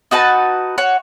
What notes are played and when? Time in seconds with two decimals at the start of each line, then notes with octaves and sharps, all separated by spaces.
0.11 D#4 F#4 B4 A5
0.78 F#4 C#5